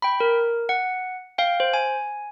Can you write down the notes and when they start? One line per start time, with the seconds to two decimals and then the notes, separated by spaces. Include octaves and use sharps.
0.02 G5 B5
0.20 A#4
0.69 F#5
1.38 F5 G5
1.60 C5
1.74 G#5